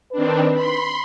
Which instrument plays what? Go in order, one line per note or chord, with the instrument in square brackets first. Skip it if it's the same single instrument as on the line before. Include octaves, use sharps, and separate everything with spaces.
[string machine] D#3 C4 D4 [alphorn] B4
[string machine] B5 C6